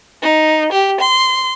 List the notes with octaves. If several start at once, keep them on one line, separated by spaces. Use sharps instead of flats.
D#4
G4
C6